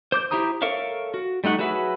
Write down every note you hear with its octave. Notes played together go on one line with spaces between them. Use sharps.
C5 D6 G6
E4 G4 C5 A#5 D#6
A4 A#4 C#5 E5 F5
F#4
G3 A3 D#4 F#5 C#6
F#3 F#4 G#4 B4 E5